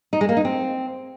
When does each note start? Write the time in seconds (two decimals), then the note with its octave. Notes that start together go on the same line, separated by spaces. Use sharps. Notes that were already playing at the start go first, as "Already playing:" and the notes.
0.13 D#4
0.21 G#3
0.29 A#3
0.37 D#4
0.45 C4